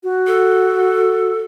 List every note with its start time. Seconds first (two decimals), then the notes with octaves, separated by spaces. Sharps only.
0.04 F#4
0.27 A4